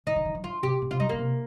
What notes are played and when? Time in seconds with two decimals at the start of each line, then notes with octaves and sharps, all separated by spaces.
0.06 D#3 D#4
0.16 D3
0.25 D#3
0.35 F3
0.44 D#3 F4
0.63 C3 G4
0.82 A#2
0.91 C3 F4
1.00 G3 D#4
1.09 A#2 A#3
1.19 C3